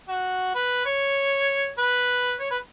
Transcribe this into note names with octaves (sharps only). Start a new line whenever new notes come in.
F#4
B4
C#5
B4
C#5
B4